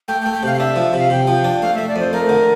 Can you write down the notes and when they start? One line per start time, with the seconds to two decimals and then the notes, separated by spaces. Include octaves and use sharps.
0.08 A3 G5
0.21 G5
0.26 A3
0.33 G5
0.43 C3 F5
0.54 F5
0.59 D4 E5
0.76 F3
0.93 C3
0.99 F5
1.10 C3 G5
1.27 F3
1.44 D4
1.62 A3 F5
1.75 A3 E5
1.88 D5
1.96 F2 C5
2.13 A3 A#4
2.29 D3